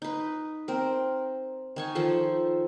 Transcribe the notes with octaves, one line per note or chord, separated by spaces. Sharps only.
D#4 B4
C4 A#4
D#3 G#5 C#6
D#3 F3 A4 C5